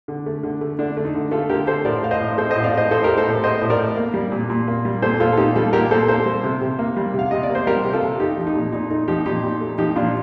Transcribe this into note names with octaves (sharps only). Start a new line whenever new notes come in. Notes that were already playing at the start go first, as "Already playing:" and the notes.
D3
A3
D3
A3
D3 D4
A3
D#4
D3
A3 F4 A4
D3 G4 A#4
A3 A4 C5
A2 A#4 D5
A3 F5
C5 D#5
A2
A3 A4 C5
A2 C5 D#5
D5 F5
A3 C5 D#5
A2 A4 C5
A3 G4 A#4
A4 C5
A2
A3 C5 D#5
A2
A#4 D5
A3
A#3
G3
A#2
A#2
A#3
G3
A#2 A4 C5
A#2 F4 A4
A4
A#3 D#4 G4
G3 F4 A4
A#2 G4 A#4
A#2 A4 C5
A#3 A4 C5
G3
C3
C3
A#3
G3
C3 F5
C3 D#5
D5
A#3
C5
G3 G4 A#4
C3
F4 A4
C3
A3 D#4 G4
F3
D#4
A#2
A#2 D#4
A3 D#4
F3 D#4 G4
A#2 D#4 G4
A#2
A3
F3 D#4 G4
A#2 D4 F4